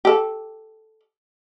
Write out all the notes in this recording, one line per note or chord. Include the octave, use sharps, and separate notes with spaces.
G4 A4